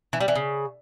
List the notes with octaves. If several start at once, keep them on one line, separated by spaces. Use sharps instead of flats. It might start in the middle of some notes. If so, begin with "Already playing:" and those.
E3
G3
E3
C#3